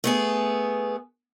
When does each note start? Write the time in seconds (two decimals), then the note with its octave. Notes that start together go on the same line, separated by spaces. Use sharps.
0.04 A3 B3 G#4